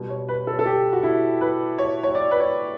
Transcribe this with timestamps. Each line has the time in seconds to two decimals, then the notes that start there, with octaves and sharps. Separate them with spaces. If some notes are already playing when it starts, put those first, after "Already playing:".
Already playing: B2 G3
0.09 C#5
0.29 B4
0.47 A4
0.59 A4
0.66 G4
0.93 F#4
1.03 E4
1.41 B4
1.78 C#5
2.03 C#5
2.15 D5
2.31 B4
2.40 C#5